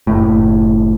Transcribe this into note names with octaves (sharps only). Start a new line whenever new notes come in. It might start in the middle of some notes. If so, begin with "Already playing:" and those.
F#1 A2